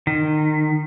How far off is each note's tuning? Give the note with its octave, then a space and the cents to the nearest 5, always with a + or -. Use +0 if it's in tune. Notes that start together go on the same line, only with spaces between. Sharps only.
D#3 -25